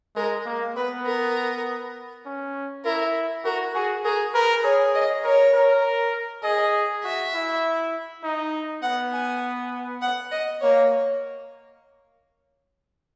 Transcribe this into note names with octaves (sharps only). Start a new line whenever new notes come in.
G#3 A#4
A#3
B3 B4
A#4
C#4
E4 A#4
F#4 A#4
F#4 G#4
G#4 A#4
A#4 B4
G#4 C#5
D#5
A#4 C#5
A#4
G#4 D#5
F#4 E5
E4
D#4
B3 F#5
G#5
F#5
D#5
A#3 C#5